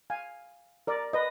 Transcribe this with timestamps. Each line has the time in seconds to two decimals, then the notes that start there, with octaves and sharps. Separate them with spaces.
0.10 F5 G#5
0.87 A#4 D5
1.13 B4 D#5